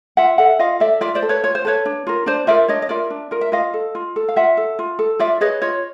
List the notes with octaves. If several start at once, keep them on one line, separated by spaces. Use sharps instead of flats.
F4 E5 F#5
A4 E5 F#5
F4 D#5 F5
A4 D5 E5
F4 D5 E5
C5 D5
A4
B4 C#5
F4 C#5
C5
A4 B4 C#5
D4
F4 A#4
D4 C5 D5
F4 A#4 D5 E5
D4 C#5 D#5
D#5
F4 A#4 D5 E5
D4
F4 A#4
E5
F4 D#5 F5
A4
F4
A4
F5
F4 E5 F#5
A4
F4
A4
F4 D5 E5
G#4 B4 C#5 D#5
F4 C#5 D#5